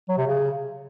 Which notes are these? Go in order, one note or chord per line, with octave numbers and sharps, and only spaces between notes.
F#3
C3
C#3